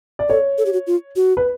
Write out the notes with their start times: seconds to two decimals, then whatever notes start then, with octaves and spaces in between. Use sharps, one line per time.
0.19 D5
0.29 A4 C#5
0.58 A4
0.66 G4
0.73 F#4
0.87 F4
1.16 F#4
1.37 B4